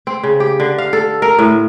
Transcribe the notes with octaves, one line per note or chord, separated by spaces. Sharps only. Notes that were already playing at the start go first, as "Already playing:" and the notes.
C4
C#3
G4
D3
F5
A4
A#4
A2